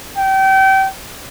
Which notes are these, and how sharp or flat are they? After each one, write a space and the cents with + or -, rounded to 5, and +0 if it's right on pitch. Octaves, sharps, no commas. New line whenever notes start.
G5 -30